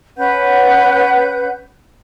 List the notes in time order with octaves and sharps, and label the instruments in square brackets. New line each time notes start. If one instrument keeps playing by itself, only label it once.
[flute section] C#4 B4 F#5 G6